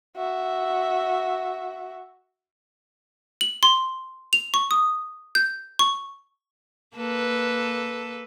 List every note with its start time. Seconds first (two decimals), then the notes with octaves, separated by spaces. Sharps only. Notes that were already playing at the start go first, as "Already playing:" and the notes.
0.17 F#4 E5
3.41 F#7
3.63 C6
4.33 F7
4.54 C#6
4.71 D#6
5.35 G6
5.79 C#6
6.96 A#3 A4 B4